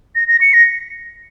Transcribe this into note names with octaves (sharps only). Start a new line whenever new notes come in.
A#6
A#6
C#7
A#6